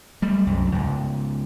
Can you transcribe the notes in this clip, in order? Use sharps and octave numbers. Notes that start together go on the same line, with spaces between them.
G3 A3
C2 F#2
C#2 G#2